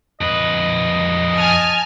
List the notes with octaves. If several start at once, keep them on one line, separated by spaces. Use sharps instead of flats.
F2 B4 D#5
G#5 A5 F6